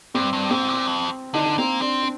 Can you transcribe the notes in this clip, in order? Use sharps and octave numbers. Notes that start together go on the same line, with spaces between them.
G2 C4
G2
G#2 C4
A#2
F2
D3 D#4
D4
A#3 C4
C4 D4
D4